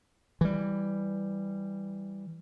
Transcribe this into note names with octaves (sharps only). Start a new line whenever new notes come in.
E3 G3